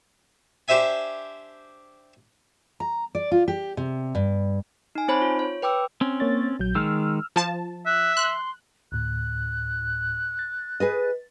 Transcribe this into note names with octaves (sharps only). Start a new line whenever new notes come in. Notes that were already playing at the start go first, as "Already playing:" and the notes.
D4 G4 C5 E5 G#5
A#5
D5
F4
G4
C3
G2
D#4 G#5
C4 D#4 C5 C#5 A5 B5
F4
C#5
B4 G5 D6 E6
C4 C#4
A#3 C#5 A6
A#1 F#3 G6
D#3 G#3 E6 F6
F3 A5
E5 F#6
C6 F#6
D2 A2 F#6
A6
G#4 B4 D#5